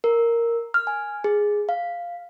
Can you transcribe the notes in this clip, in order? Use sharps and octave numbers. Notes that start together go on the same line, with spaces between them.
A#4
F6
G#5
G#4
F5